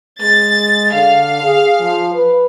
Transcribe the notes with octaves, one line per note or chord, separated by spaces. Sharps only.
G#3 A6
D3 F5
G#4
F3
B4